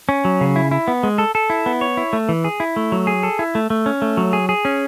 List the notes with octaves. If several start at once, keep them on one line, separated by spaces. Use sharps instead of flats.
C#4
F#3
C#3
E4
E4
B3
G#3
A4
A4
E4
B3
C#5
E4
A3
E3
G#4
E4
A3
F#3
G#4
A4
E4
A3
A3
C#4
A3
F#3
G#4
G#4
C#4